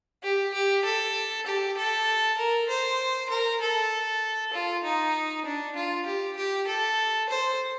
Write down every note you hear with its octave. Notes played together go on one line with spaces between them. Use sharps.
G4
G4
A4
G4
A4
A#4
C5
A#4
A4
F4
D#4
D4
F4
G4
G4
A4
C5